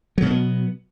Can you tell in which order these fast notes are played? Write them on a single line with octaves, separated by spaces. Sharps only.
F#3 B2 A3 B3